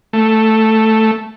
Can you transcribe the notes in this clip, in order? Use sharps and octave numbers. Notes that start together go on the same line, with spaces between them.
A3